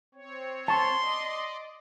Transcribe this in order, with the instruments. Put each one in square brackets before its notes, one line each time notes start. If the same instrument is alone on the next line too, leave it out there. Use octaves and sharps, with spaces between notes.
[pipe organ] C4 C#5
[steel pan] A5 C#6 [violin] C6
[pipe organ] D5 D#5